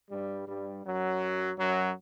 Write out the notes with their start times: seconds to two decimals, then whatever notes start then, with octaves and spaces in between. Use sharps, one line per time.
0.10 G2 G3
0.47 G2 G3
0.84 F#2 F#3
1.58 F#2 F#3